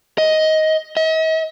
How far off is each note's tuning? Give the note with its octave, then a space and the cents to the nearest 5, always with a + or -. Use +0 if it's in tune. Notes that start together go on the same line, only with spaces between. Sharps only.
D#5 +10
D#5 +45